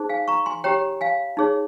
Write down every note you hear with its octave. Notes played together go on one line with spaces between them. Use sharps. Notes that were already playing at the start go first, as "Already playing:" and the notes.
Already playing: D#4 G#4 C5
F5 G#5
A#5 C#6
G#5 C6
G4 C#5 G5 A#5
F5 G#5
D#4 G#4 C#5